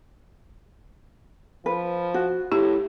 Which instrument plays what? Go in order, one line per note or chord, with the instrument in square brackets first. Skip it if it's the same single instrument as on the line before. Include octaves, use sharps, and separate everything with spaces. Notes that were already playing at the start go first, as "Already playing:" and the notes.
[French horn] F3 [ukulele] B4
[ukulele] F#4
[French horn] A2 [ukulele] E4 [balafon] G4